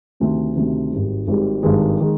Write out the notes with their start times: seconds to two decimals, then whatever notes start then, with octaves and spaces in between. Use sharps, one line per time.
0.20 D2 C3 D#3
0.56 D2 C3 D#3
0.92 G#1 G#2 G3
1.28 G#1 G#2 G3
1.63 G#1 G2 D#3 G#3
2.00 D#3 G#3